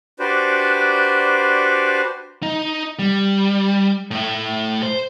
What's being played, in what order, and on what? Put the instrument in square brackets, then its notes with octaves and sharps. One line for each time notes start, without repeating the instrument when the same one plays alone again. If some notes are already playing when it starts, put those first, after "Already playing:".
[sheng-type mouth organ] D4 F#4 G4 B4 C5 D5
[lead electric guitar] D#4
G3
A2 A3
C5